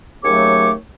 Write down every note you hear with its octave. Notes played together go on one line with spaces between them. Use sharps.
D#2 C#3 F#3 A3 C#5 D6